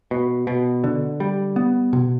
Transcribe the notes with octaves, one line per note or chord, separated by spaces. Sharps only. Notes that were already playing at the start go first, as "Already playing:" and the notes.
B2
B2
D3
G3
B3
B2